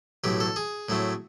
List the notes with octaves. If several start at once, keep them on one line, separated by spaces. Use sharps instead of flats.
B1 A2 F#3 G4
A4
G#4
A2 F#3 A3 C4